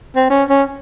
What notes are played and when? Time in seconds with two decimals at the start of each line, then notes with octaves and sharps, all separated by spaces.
0.16 C4
0.30 C#4
0.50 C#4